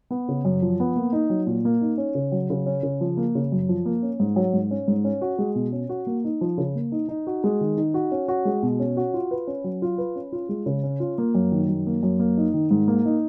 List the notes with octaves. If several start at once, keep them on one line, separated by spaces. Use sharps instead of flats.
B3
C#3
F#2
F3
B3
A#3
D#4
F#3
A#2
A#3
D#4
C#4
C#3
F#3
C#3
C#4
C#3
F3
A#3
C#3
F#2
F3
A#3
C#4
G#2
F#3
G#2
C#4
G#2
C#4
F#4
G#3
B2
C#4
F#4
A#3
D#4
F3
C#3
A#3
D#4
D#4
F#4
G#3
D#3
D#4
F#4
C#4
F#4
G#3
B2
C#4
F#4
F4
B4
C#4
F#3
F4
B4
C#4
F4
G#3
C#3
C#4
F4
A#3
F#2
D#3
F#2
A#3
F#2
A#3
D#4
D#3
G#2
A#3
D#4